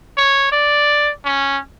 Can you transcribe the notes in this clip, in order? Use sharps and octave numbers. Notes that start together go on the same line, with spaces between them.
C#5
D5
C#4